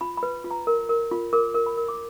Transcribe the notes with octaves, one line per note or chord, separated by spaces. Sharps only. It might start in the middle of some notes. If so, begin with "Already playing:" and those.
F4 B5
B5
B4
F4
A#5
A#4
A#4
F4
A#4 D6
A#4
B5
A#4
D6